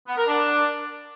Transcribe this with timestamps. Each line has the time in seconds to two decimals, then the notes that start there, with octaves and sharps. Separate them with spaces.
0.07 B3
0.18 A#4
0.28 D4